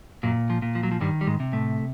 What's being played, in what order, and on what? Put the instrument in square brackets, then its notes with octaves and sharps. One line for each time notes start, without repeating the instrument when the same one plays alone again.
[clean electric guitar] F#2 A#2 F#3
F3
A#2
F3
F#3
F3
G2 D#3 G3
G3
G#2 G#3
C3
A2 A3